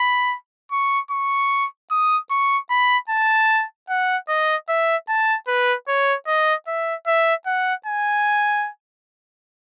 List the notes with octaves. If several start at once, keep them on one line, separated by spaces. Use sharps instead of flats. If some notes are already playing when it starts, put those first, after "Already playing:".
Already playing: B5
C#6
C#6
D#6
C#6
B5
A5
F#5
D#5
E5
A5
B4
C#5
D#5
E5
E5
F#5
G#5